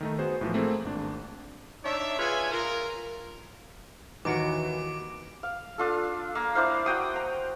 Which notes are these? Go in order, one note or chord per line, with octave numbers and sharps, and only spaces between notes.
D#3 A3 D#4
B3 F#4 G#4 C5
A2 E3 F3
A3 A#3 C4 G#4
G#1 D4
D4 D#4 C#5 D5 E5
F4 G#4 B4 C#5 E5 G#5
F4 A#4
D#2 D#3 E3 A#3 F#4 D6 C#7 D7
F5
D4 F4 A4
A#3
D4 E4 C5 F5
F#4 G5 D#6
A#5